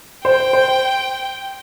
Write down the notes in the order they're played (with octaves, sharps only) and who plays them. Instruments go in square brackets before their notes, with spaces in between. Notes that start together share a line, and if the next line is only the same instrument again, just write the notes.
[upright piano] C5 [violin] G5
[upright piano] C5